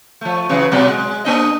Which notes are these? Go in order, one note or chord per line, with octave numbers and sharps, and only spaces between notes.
F3 A3
C#3 E3 F#3
B2 F#3 G#3
G#3
A#3 D4 D#5